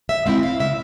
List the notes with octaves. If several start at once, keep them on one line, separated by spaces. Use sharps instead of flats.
E5
G#3 C4 E4 F5
F5
C#3 E5